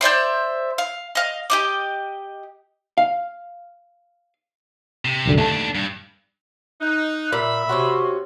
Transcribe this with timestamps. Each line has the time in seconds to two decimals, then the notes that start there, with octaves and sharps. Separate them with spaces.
0.01 C5 D5 E5 C6
0.78 F5
1.15 D#5 F5
1.50 G4 D#5 D6
2.98 F5
5.05 C3
5.25 C2 F#2 D3
5.38 D#2 A3 D4 A5
5.75 G2
6.81 D#4 F#6
7.32 A#2 E5 B5
7.69 C3 C#4 F#4 C6